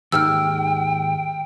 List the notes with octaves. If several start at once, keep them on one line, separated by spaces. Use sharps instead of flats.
D#2 G#2 D#3 G5 E6 F6